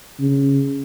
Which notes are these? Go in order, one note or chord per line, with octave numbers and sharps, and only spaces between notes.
C#3